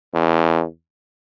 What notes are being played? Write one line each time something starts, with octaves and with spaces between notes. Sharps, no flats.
E2